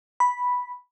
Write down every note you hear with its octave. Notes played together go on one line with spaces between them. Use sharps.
B5